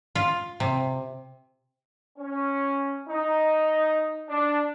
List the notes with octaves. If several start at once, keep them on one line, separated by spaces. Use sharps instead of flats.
F4
C3
C#4
D#4
D4